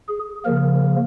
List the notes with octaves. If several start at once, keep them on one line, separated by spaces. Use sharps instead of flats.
G#4
C#3 F3 A#3 A#4